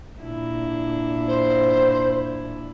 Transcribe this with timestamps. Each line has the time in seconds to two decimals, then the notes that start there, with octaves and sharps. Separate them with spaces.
0.20 A#2 D4 E4
1.27 C5